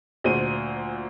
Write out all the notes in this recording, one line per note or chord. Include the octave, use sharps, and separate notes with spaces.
D2 A#2 C5 D#7